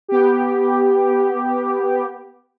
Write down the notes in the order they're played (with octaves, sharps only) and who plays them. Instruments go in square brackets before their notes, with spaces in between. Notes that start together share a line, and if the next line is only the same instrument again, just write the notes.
[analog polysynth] B3 G4